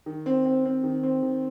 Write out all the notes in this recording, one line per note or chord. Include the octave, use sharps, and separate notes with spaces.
D#3
C4
C4
C4
D#3
C4
D#3